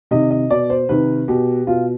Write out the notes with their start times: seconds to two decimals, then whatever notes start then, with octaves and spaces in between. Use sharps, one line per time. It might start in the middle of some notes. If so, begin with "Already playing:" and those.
0.11 C3 D#3 D#5
0.31 D#5
0.50 B2 D5
0.70 C5
0.89 C3 D#3 B4
1.28 B2 G4
1.67 B2 F4